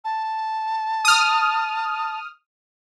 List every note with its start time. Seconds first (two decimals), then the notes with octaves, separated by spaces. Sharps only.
0.05 A5
1.05 D#6 F6